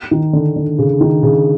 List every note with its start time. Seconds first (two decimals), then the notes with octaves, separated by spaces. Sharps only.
0.11 D#3
0.33 D3
0.56 D3
0.78 C#3
1.01 D#3
1.23 C#3